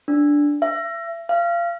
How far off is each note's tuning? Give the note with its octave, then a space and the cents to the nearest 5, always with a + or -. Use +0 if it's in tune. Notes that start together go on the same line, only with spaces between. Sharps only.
D4 -5
E5 +35
F5 -25